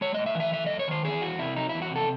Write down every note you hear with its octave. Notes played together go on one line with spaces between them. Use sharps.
G#3 C#5
A2 D#5
E5
E3
E5
A3 E5
F#2 D#5
C#5
D#3 C5
E3 G#4
E2 F#4
C3 E4
F#3 D#4
E2 E4
F#4
C3 A4